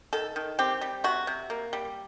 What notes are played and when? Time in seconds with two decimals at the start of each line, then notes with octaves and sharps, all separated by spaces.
0.13 D#3 A4
0.36 D#3
0.59 C4 G4
0.81 G3
1.04 C3 F#4
1.27 C3
1.50 A#3
1.73 G3